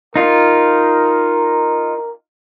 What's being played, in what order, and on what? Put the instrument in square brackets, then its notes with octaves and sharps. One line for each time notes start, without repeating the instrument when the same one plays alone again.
[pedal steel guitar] D#4 F4 [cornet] A#4